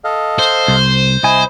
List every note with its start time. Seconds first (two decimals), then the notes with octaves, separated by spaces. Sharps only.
0.04 A4 D#5 F5
0.39 C5
0.68 C2
1.23 C2 E4 D#5 G#5